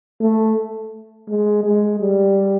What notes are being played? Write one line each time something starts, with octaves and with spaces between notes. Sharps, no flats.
A3
G#3
G#3
G3